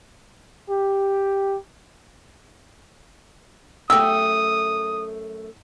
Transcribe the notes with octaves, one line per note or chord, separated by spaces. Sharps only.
G4
F#2 A3 F#4 G4 G5 D#6 E6